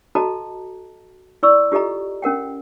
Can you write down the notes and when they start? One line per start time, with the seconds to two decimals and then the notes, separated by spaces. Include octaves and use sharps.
0.15 F#4 A4 D#5 A5 A#5
1.43 E4 D5 C6 C#6 E6
1.72 F4 G4 A4 D#5 A#5
2.22 C#4 A#4 F#5 G5